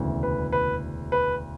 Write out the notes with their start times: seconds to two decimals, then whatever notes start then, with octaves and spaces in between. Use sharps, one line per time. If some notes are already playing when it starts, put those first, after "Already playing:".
Already playing: E1 D2 C#3 E3
0.23 B4
0.52 B4
1.12 B4